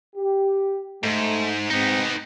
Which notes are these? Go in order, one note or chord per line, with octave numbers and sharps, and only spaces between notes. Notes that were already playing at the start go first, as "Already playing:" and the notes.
G4
G#2 A3
G#2 B3 C4 D#4